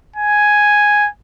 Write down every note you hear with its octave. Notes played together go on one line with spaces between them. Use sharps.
G#5